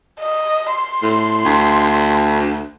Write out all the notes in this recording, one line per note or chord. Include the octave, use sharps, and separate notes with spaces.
D#5
C6
A2
D2